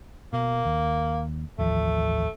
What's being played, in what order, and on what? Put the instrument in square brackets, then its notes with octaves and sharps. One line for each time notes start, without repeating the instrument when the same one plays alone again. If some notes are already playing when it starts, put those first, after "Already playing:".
[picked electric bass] B2 [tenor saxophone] A#3
[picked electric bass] D#2
[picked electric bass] A1 D#2 F3 [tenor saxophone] A3